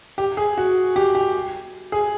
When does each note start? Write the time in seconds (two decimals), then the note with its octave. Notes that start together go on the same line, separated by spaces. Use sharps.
0.18 G4
0.37 G#4
0.58 F#4
0.96 G4
1.15 G4
1.92 G#4